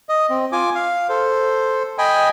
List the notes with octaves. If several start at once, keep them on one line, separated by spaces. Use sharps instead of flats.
D#5
C4
F4 G#5 D6
F5
A4 C5
D#5 G5 G#5 B5